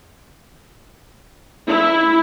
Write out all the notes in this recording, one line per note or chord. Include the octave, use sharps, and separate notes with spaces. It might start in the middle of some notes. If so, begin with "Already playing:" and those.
E4